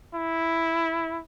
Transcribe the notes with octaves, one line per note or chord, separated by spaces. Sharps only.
E4